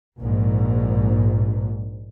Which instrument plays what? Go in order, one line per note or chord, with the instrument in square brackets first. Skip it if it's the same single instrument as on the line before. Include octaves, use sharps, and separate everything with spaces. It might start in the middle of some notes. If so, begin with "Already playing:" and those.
[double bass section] A#1 G#2